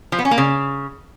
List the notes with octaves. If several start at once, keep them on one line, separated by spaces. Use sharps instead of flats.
F3
B3
C#4
A#3
C#3